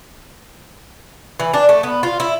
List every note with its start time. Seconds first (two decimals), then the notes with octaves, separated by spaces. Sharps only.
1.40 E3
1.54 D4
1.69 A3
1.83 B3
2.03 F4
2.20 E4